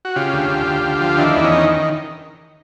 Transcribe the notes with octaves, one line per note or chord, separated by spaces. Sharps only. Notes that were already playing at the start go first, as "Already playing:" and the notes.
F#4
C#3 F4 G4
D2
D2
D2
D2
F3
D#3 D4 E4
E2
C#4 D#4
D#3